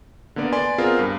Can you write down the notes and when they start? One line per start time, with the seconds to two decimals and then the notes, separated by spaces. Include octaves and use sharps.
0.36 D3 A#3 B3 D5
0.53 B4 D5 G#5 C6
0.78 B3 C4 F4 G#4 A#4 C5
0.99 G2